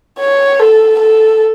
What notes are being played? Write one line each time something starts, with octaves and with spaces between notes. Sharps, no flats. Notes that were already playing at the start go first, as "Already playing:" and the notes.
C#5
A4
A4